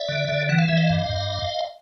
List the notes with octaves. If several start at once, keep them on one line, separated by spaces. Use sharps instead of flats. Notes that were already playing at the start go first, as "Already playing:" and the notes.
Already playing: D5 E5
D3
D3
E3 F#5
F5
E3 E5
D#5 F5
G2
G2